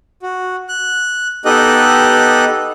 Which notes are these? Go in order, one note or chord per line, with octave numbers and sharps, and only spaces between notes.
F#4
F#6
B3 D#4 G4 A4 D#5 F#6